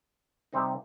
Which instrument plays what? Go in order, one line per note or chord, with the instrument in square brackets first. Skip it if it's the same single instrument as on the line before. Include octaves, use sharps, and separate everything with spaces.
[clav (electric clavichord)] C3 G3 C4 D#4